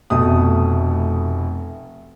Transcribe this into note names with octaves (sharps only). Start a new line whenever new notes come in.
F1 B2 A3 D#6